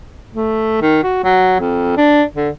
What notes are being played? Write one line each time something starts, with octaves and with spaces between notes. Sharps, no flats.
A3
D#3
F#4
F#3
F2
D4
D3